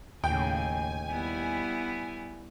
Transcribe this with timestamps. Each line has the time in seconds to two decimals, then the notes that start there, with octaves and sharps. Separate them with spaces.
0.24 D#2 A2 C#3 G5 G#5
1.09 G3 B3 E4